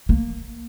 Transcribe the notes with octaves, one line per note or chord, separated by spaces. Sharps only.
A#3